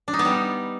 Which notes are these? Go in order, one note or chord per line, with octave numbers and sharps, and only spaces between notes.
D4
D#4
B3
G3